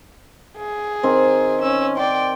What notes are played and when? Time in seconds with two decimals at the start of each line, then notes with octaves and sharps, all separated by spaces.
0.58 G#4
1.03 D#3 C4
1.62 C#4 E6
1.97 D5 G5 C6